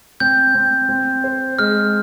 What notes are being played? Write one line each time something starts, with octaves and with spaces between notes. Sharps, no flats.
C4 G6
C4
C4
C5
G#3 F6